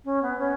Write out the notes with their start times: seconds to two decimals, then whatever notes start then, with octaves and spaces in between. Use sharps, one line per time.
0.05 C#4
0.22 B3
0.39 C#4